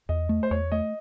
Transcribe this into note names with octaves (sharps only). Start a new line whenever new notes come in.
E2 D#5
A3
C5
E2 C#5
A3 D#5